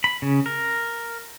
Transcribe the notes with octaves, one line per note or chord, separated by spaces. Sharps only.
B5
C#3
A#4